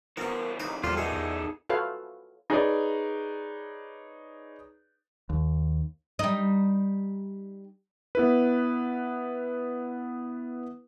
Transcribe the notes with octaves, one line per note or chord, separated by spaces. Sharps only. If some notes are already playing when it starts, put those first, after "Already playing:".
E3 B3 C4 F#4 A#4
A#3 D#4 B4
E2 A#2 F3 G3 F4 A4
A#2 B3 D#4 F4 G#4 A4
E2
F4 F#4 A4 B4 C#5 F5
D#4 G#4 B4 C#5 D5
D#2
G3 D#4
B3 E4 B4